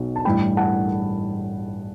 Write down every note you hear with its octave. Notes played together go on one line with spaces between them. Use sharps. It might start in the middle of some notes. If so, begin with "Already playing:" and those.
Already playing: B1 B2
A5
A1 G2 E3 G5 B5
F#5 A5